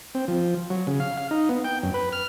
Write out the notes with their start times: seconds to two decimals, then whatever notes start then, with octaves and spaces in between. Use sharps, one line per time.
0.15 C4
0.28 F3
0.70 F#3
0.87 C#3
1.00 F5
1.18 F5
1.31 D#4
1.49 B3
1.64 G5
1.83 F#2
1.94 B4
2.13 F6